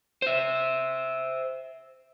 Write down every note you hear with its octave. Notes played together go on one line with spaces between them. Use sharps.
C5 E5